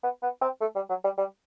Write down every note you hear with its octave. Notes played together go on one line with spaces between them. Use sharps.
B3
B3
C4
A3
G3
F#3
G3
G3